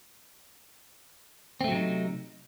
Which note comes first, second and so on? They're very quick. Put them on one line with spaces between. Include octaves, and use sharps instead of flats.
C4 A3 F#3 C3 D#4